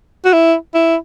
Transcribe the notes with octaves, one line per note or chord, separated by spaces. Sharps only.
F#4
E4
E4